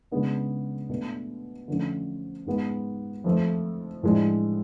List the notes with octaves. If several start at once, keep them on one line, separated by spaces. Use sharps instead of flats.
C#3 G#3 B3 D4
B2 A3 D4
D3 F3 A3 C#4
G#2 G#3 B3
F2 F3 A3
A2 F3 G#3 D4